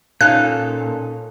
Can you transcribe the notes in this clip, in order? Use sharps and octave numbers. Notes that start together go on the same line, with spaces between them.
A#2 C#4 D#4 A4 F5 F#6